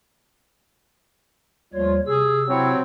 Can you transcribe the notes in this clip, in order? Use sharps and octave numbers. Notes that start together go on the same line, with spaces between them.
D#2 F3 G3 A3 F4 C#5
C3 G#4 E6
F#3 C4 E4 C#5